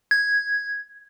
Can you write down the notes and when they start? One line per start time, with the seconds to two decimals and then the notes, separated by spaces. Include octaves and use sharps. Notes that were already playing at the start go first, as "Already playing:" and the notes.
0.11 G#6